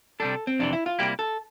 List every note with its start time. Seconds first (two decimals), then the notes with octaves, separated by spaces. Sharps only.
0.20 C3 G3 D4 A4
0.47 C4
0.59 F2 C3 E3 D4
0.73 E4
0.86 F4
0.99 C3 G3 A#3 E4 G4
1.19 A4